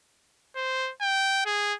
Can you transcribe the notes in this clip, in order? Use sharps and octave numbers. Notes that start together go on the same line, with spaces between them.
C5
G5
G#4